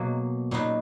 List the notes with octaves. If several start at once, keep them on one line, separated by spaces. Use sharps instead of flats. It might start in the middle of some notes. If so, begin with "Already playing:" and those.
Already playing: B2 F#3 A#3
A#2 F#3 B3 D#4